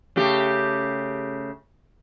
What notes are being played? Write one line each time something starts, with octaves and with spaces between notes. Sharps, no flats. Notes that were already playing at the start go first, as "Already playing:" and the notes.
C#3 A3 G4